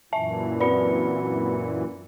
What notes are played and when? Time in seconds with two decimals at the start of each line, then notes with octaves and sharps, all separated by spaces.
0.13 F#2 A#2 E3 E5 A5
0.61 C4 F#4 B4 D5 B5 C#7